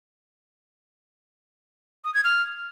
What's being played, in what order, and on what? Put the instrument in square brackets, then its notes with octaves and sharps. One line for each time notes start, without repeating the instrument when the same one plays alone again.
[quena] D#6
G#6
F6